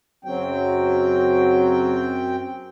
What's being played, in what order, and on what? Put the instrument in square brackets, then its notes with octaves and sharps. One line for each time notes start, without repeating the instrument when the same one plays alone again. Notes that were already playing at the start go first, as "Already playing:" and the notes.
[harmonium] F#2 C4 G5 [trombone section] C#3 F#3